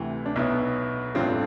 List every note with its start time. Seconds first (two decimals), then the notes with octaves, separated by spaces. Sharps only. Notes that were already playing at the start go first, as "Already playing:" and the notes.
Already playing: D2 C3 E3
0.26 D4
0.36 B1 B2 B3 E4
1.14 A1 G2 D3 A3 C4 F4